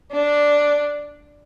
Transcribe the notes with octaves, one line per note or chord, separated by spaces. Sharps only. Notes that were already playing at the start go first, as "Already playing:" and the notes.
D4